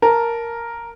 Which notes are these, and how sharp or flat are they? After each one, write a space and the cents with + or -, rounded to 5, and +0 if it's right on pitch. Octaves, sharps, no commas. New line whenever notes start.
A#4 +0 A5 +0